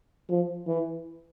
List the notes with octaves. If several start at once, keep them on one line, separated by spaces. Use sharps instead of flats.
F3
E3